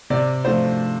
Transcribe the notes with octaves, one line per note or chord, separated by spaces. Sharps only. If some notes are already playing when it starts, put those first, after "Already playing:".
C3 D5
F3 A3 D4 C5